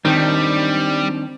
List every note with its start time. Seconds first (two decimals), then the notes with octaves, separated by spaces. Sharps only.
0.05 D#3 G3 C4 D4 D#4